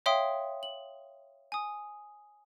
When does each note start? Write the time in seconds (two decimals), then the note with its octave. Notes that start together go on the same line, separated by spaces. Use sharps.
0.06 C#5 E5 F5 G5 C6 D#6
0.63 F#7
1.52 G#5 D#6